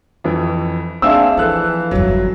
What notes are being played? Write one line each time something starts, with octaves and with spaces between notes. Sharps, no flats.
F2 E3
A#3 C4 D4 G#4 E5 F5 E6
E3 F3 A4 F#6
G1 F2 F#3